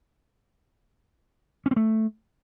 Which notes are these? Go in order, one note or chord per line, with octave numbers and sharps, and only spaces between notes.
C#4
C4
A3